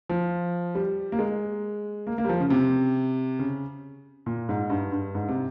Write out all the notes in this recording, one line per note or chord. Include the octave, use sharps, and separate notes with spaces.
F3
G3
A#3
G#3
A#3
A#3
G3
F3
C#3
C3
C#3
A#2
G#2
G2
G2
G#2
C3